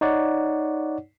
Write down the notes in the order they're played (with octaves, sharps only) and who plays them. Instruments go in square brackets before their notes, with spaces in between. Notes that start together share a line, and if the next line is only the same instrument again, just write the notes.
[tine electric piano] D#4 C#5 D5 F#5